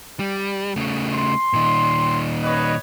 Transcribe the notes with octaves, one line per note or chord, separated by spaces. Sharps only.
G3
C#3 A3
C6
A#2 D#3
B4 C#5 D#5